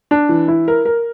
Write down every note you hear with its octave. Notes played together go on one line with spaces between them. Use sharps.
D4
E3
E4
A#4
A#4